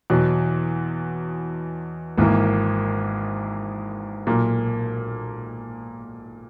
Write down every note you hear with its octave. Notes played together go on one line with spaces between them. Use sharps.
E2 B2 F#3
G#1 G#2 E3 A#3
B1 A#2 A#3